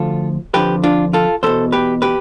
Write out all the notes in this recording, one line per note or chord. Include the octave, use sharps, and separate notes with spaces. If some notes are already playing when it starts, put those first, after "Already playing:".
Already playing: D2 D3 F3 F4 A4
F2 D3 F3 G4 B4
D4 F4
F4 A4
E2 B2 A4 C5
G4 B4
G4 B4